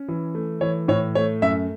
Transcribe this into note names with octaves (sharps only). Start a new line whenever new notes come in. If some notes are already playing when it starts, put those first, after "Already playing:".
Already playing: C#4
E3
A3
E3 C#5
A2 C#5
A3 C#5
F#2 E5